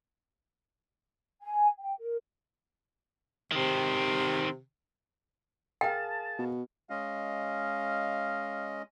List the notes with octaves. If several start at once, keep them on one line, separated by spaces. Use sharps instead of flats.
G#5
G5
A#4
C3 D#3 C4
G#4 A#4 F5 G5 A5
B2
G#3 C#4 D#5 F5